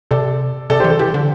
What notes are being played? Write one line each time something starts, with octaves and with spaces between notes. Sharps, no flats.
C3 A4 D5
C3 A4 D5
E3 G4 C5
A4
E3 G4
D3